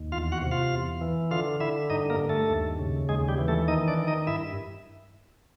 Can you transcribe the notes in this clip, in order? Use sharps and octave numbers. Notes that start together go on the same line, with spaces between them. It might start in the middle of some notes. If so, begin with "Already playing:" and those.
Already playing: D#2
E2 F4 F5
F#4 F#5
C3
F4 F5
E2
E3
D3 F4 F5
D3 E4 E5
G2 D#4 D#5
A#3 A#4
G2
A3 A4
D#2
C#3
D#2 G#3 G#4
G3 G4
E3
A3 A4
D#3 D#4 D#5
D4 D5
D#3
D#4 D#5
G2 E4 E5